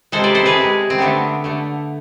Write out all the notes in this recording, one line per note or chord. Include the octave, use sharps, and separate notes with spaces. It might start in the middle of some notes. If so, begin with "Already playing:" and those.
C3 G#3 A4 C5
B4 D5
A4 C5
G#4 B4
C3 G#3
C4
D3 A3 B3 D4
D3 A3